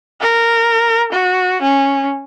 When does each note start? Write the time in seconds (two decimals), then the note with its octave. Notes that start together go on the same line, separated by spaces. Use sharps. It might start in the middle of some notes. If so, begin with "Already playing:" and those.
0.21 A#4
1.12 F#4
1.62 C#4